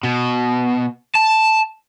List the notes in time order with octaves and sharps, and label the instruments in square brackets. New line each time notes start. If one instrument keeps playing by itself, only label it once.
[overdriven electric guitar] B2
A5